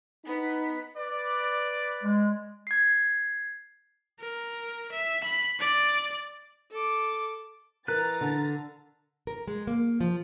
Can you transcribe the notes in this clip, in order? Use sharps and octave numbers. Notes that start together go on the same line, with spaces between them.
B3 D#4 B6
B4 D5
G#3
G#6 C7
A#4
E5
B5
D5
A4 D6
E3 A#4 B4 A#5 F#6 A6
D3
A#4
G#3
A#3
F3